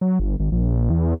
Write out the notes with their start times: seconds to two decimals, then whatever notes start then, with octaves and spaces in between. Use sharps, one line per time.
0.01 F#3
0.19 G1
0.40 G#1
0.52 A#1
0.90 E2